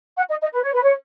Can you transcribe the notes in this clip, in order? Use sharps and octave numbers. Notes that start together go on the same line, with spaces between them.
F#5
D#5
D#5
B4
C#5
B4
C#5